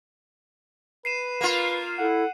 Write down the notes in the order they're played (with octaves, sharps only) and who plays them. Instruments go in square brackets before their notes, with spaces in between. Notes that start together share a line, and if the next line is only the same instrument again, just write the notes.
[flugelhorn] B4 [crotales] C7 D#7 E7
[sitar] A#3 F4
[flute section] E4 A4 [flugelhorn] F#5